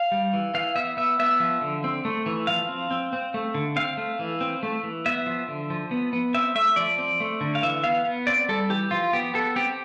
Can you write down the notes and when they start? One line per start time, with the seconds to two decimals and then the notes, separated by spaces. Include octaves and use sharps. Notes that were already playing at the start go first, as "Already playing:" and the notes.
Already playing: F5
0.12 G3
0.33 E3
0.54 E3 F5
0.76 B3 E5
0.97 B3 E5
1.19 B3 E5
1.40 F3
1.61 D3
1.84 C4
2.05 A3
2.26 E3
2.47 F3 F5
2.69 C4
2.91 C4
3.13 C4
3.34 A3
3.54 D3
3.76 C4 F5
3.97 A3
4.19 E3
4.40 C4
4.63 A3
4.83 E3
5.06 B3 E5
5.26 F3
5.48 D3
5.70 F3
5.91 B3
6.13 B3
6.34 C4 E5
6.55 A3 E5
6.76 F3 D5
6.98 C4
7.20 A3
7.41 D3
7.55 F5
7.62 E3 E5
7.84 B3 F5
8.05 B3
8.27 C4 D5
8.49 G3 A4
8.70 E3 G4
8.91 F3 F4
9.13 B3 G4
9.34 B3 A4
9.56 C4 G4